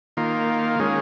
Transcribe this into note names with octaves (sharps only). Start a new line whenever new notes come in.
D#3 A#3 F4
D#3 G#3 C#4